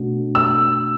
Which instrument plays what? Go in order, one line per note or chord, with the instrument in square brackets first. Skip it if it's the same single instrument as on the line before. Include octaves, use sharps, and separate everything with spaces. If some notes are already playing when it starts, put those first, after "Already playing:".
Already playing: [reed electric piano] B2 A3 D4 F#4
[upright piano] E6